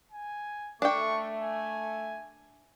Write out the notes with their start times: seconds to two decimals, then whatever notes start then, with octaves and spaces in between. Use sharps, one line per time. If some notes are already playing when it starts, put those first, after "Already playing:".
0.12 G#5
0.82 A3 D4 G5 C#6
1.42 G#5